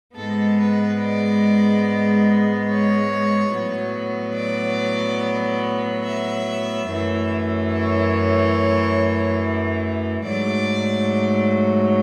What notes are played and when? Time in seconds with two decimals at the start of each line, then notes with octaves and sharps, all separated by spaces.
0.17 G#2 G#3 B3 A4
0.59 B4
1.01 D5
2.69 C#5
3.53 A2 F#3 B3
4.37 D5
6.05 E5
6.89 F#2 E3 A3
7.72 C#5
10.24 G#2 F#3 A3 D5